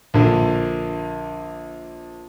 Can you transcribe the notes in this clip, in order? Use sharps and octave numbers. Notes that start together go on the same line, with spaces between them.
A#1 D3